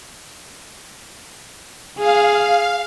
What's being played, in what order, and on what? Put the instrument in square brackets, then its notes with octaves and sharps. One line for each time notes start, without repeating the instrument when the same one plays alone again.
[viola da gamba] G#4 [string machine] F5